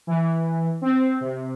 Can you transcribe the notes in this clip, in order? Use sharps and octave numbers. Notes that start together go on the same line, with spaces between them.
E3
C4
C3